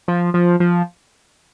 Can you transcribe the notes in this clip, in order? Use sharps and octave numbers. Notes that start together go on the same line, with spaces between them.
F3
F3
F3